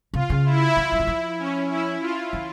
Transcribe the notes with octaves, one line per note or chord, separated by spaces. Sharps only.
C3 F4
C#3
E4
E3
F3
E3
F3
C#4
E4
F4
E3